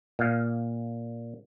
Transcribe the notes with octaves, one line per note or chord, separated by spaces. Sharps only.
A#2 F5